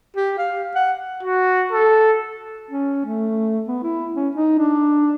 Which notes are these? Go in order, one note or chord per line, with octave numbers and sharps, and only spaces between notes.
G4
F5
F#5
F#4
A4
C#4
A3
B3
E4
C#4
D#4
D4